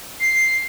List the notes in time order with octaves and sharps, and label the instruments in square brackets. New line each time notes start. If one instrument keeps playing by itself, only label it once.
[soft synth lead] C7